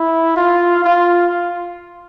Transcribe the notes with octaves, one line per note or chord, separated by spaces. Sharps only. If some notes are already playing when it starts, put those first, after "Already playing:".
Already playing: E4
F4
F4